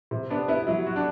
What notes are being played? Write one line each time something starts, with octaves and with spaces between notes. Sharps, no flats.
C3
B3 D4
B3 E4
F#3 E4
F#4
D4